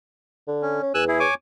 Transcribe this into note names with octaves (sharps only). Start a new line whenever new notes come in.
D3
C#4
C#4
E2 G#5 E6 F#6
E4 G#4
C#5 G#5 D6